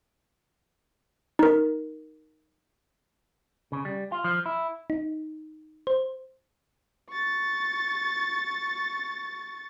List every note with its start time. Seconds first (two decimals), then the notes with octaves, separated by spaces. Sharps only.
1.39 D#4 A#4
3.72 C#3
3.85 G3
4.12 F4
4.24 F3
4.46 E4
4.90 D#4
5.87 C5
7.10 C#6 A6